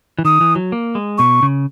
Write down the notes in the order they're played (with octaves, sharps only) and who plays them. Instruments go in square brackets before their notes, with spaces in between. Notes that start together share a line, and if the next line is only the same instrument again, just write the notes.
[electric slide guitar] E3
[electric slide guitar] D#3 [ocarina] D#6
[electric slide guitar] E3
F#3
A#3
G#3
[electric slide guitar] B2 [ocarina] C#6
[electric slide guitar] C#3